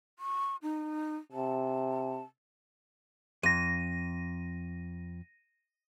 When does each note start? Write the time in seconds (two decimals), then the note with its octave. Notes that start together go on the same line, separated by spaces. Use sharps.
0.19 C#6
0.63 D#4
1.32 C3 A5
3.43 F2 A#6 D#7